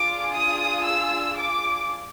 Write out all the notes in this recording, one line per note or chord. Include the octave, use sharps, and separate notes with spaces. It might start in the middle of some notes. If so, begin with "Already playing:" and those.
Already playing: D4 F4 G#4 D6
D#6
E6
D6